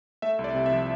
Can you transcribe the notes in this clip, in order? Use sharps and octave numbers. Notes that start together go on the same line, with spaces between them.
A3 E5
C2
D5
C3
E5
F3